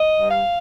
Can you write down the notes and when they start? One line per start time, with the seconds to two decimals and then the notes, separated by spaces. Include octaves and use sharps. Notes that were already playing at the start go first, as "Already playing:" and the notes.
Already playing: D#5
0.16 G2
0.31 F5